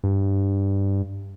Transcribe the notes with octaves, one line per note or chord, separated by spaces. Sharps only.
G2